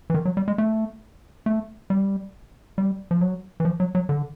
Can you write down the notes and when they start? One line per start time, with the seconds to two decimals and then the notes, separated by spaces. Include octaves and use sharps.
0.10 E3
0.14 D#3
0.25 F#3
0.37 G3
0.48 G#3
0.58 A3
1.46 A3
1.90 G3
2.78 G3
3.11 F3
3.21 F#3
3.60 E3
3.65 F3
3.80 F#3
3.95 F#3
4.09 D3